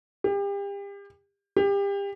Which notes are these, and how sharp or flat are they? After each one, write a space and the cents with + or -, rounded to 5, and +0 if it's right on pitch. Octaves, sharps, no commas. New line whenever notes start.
G4 +35
G4 +30